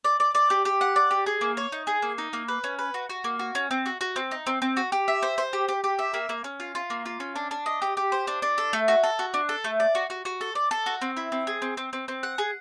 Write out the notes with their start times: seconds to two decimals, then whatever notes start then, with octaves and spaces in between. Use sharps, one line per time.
0.04 D5
0.20 D5
0.35 D5
0.50 G4
0.65 G4
0.81 F#5
0.96 D5
1.11 G4
1.26 G#4
1.41 A#3
1.57 C#5
1.72 D#4
1.87 G#4
2.02 A#3
2.18 D#4
2.33 A#3
2.48 B4
2.64 C#4
2.79 B4
2.94 F#4
3.10 F#4
3.24 A#3
3.39 F#4
3.55 C#4
3.71 C4
3.86 F#4
4.01 F#4
4.16 C4
4.31 D#4
4.47 C4
4.62 C4
4.77 F#4
4.92 G4
5.08 E5
5.22 C5
5.38 C5
5.53 G4
5.68 G4
5.84 G4
5.99 E5
6.14 A#3
6.29 A#3
6.44 C#4
6.60 F4
6.75 F4
6.90 A#3
7.06 F4
7.20 C#4
7.36 D4
7.51 D4
7.66 D#5
7.82 G4
7.97 G4
8.12 C5
8.27 D4
8.42 D4
8.58 A4
8.73 A3
8.88 F#4
9.03 A4
9.19 F#4
9.34 D4
9.49 A4
9.64 A3
9.80 D5
9.95 F#4
10.10 F#4
10.25 F#4
10.41 A4
10.55 D5
10.71 A4
10.86 F#4
11.01 C4
11.17 E4
11.32 C4
11.47 G#4
11.62 C4
11.77 C4
11.93 C4
12.08 C4
12.23 F#5
12.38 G#4